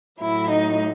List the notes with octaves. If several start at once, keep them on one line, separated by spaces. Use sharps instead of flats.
A2 F#3 E4
D#4